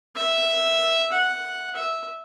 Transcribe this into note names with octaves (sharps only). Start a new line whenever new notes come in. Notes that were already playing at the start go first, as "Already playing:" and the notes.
E5
F#5
E5